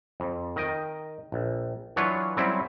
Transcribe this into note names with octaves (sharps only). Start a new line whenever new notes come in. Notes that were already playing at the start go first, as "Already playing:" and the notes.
F2
D#3 D#5 G5
A#1
E3 F#3 D4 F4 B4 C#5
F#3 G3 C4 C#4 E4